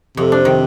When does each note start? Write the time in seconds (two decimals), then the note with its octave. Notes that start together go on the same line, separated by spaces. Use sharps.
0.17 F2 C3
0.32 D4
0.45 D#3